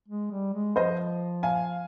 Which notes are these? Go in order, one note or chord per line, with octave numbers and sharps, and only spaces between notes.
G#3
G3
G#3
F3 C5 D#5
F5 G#5